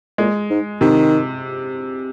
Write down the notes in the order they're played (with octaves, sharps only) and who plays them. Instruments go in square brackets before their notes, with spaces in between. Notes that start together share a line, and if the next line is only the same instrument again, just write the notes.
[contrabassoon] A#2 [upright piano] G#3
[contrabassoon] G#2
[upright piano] C3 [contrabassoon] D#3